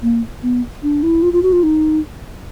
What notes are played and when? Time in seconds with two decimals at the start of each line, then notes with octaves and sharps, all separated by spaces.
0.02 A#3
0.43 B3
0.83 D4
1.03 E4
1.22 F4
1.33 F4
1.43 F#4
1.53 F4
1.63 D#4